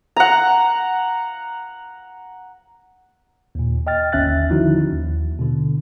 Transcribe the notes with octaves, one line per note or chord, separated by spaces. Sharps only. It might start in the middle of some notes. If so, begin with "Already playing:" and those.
F#5 A#5
D#2 A#2
D#5 G5 F6 A6
G1 D#2 C#4 E5 F#6 A6
D3 D#3 F3 D#4 E4 F#4
D#2
B2 D3